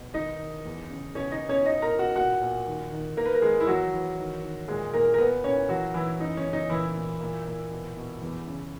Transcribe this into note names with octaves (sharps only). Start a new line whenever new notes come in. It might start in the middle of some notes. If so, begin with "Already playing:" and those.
Already playing: B2
D#3 D#4 D#5
D#3
E2
C#3
B2 C#4 C#5
D#4 D#5
B2
C#4 C#5
B2 D#4 D#5
A#4 A#5
B2
F#4 F#5
A#2 F#4 F#5
A#2
D#3
D#3
D#3 A#3 A#4
B4
A#4
D#3 G#3 G#4
E4
E3 F#3 F#4
E3
D#3
D#3
A#2 G#3 G#4
A#2 A#3 A#4
A#4
A#2 B3 B4
A#2 C#4 C#5
E3 F#3 F#4
E3 E4
F#2 D#4
C#4
C#3
D#4
A#2 E3 E4
A#2
A#2
A#2
B2
B2
E2
C#3